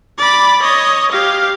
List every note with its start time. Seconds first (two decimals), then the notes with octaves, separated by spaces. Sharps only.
0.19 D5 B5
0.62 C#5 D#5
1.12 G4 F5